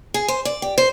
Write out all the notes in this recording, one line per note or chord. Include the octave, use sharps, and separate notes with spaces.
G#4
C5
D5
G4
C5